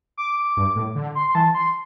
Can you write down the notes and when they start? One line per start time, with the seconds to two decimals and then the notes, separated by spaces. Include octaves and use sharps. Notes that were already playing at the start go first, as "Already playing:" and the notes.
0.18 D6
0.57 G2
0.76 A2
0.96 D3
1.15 C6
1.29 C6
1.35 E3 A5
1.54 C6